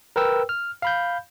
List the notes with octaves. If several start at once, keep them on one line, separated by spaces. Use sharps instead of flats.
A#4 B4 G5 E6
F6
F5 B5 G6